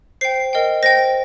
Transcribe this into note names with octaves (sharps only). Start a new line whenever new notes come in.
C5 G5 C7
A#4 D#5 G5
C5 G5 A#6